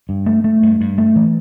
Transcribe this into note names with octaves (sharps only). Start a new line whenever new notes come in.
G2
A3
A3
G2
G2
A3
E3